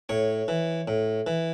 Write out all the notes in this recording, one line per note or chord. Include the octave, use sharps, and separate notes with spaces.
A2 C#5
E3
A2
E3